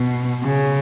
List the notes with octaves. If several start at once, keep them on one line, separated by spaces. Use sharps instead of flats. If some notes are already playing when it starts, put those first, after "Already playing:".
Already playing: B2
C#3